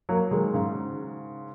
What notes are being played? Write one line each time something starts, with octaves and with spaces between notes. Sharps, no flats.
F#3 A#3
D#3 G#3
G#2 C#3